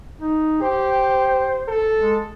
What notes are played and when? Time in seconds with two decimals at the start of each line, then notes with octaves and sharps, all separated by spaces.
0.21 D#4
0.62 G4 C5
1.68 A4
1.97 G#3